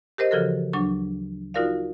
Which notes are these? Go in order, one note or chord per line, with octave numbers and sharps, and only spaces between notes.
G4 A#4 C5 D#5
C#3 E3 F3 F#4 A4 A#4
D2 F#3 D4 C#6
D#4 F4 F#4 A#4 D5 F5